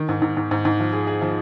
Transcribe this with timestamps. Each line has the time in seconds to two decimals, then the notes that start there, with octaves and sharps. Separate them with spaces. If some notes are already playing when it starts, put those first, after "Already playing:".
Already playing: D#3
0.09 G#2
0.22 G#2
0.37 G#2
0.51 G#2
0.65 G#2
0.80 F3
0.93 G#4
1.07 G#4
1.21 F3